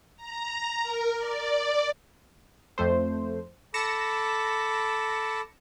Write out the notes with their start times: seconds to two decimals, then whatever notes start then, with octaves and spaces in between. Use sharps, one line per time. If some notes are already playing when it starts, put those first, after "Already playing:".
0.17 A#5
0.83 A#4
1.17 D5
2.78 F2 A3 C5
3.74 A4 B5 D6 A#6 C#7 E7